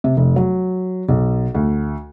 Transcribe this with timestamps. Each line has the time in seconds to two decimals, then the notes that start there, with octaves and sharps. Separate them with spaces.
0.04 C3
0.17 F1
0.36 F#3
1.09 B1
1.55 D2